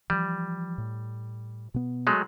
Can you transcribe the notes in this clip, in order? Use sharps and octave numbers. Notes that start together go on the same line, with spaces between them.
E3 F3 G3
A2
B2 B3
F#3 G#3 A3